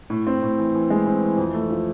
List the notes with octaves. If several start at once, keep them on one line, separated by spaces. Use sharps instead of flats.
A2
C4
A2
E3
E3
G#3
C4
E3
F2
A3
F3